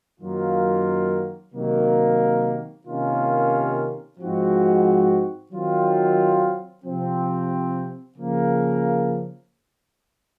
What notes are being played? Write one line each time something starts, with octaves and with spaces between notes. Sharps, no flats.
F#2 D#3 F#3 A#3 F4
C3 D#3 F#3 A#3
C3 D#3 A#3 C#4 F4
G#2 F3 C4 D#4 F#4
D#3 F#3 C4 F4
C3 F3 C4
C#3 F3 A#3